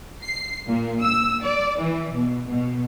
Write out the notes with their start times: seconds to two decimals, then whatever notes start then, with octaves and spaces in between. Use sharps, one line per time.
0.23 C7
0.68 A#2
1.02 E6
1.43 D5
1.80 E3
2.14 B2
2.50 B2